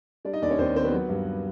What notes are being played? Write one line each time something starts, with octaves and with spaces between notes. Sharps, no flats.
G3 D4 D5
D#4 D#5
D#2 D4 D5
C#4 C#5
D#2 C4 C5
D#3 C4 C5
B3 B4
F#3
G2